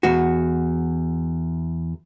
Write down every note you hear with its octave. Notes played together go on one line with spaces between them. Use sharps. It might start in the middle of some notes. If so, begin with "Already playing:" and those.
E2 F#4